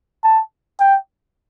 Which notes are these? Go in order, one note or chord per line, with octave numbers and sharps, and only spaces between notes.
A5
G5